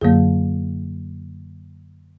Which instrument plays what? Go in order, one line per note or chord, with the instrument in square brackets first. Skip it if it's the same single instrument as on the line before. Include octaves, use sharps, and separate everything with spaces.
[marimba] F#2 D3 F#3 A#3 G#4